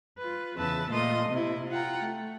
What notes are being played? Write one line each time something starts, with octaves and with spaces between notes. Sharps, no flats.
F4 B4
E2 C#3 B4 E5 A5
A#2 A3 A#3 D#5 C6 D#6
C3 E4
F4 F#5 G5 A#5
A3